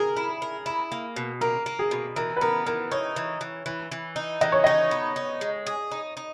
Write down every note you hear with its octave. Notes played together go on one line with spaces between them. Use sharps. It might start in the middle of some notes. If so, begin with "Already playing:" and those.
Already playing: G#4 A#4
E4
A#4
E4
A#3
B2
A#3 A#4
A#3
G#4
B2
E3 A#4
B4
B3 A#4
E3 A#4
D#4 C#5
E3
E3
E3
E3
D#4
E3 D#5
C#5
D#4 D#5
B3
D#4
G#3
G#4
D#4
D#4